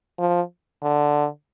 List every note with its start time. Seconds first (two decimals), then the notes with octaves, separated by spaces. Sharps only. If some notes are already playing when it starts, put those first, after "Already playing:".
0.19 F3
0.83 D3